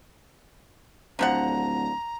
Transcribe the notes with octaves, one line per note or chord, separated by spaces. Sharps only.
D1 D3 F3 F#5 A#5